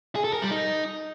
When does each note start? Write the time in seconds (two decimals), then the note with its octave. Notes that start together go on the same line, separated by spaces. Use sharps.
0.16 G#4
0.24 A4
0.33 A#4
0.42 G3
0.51 D#4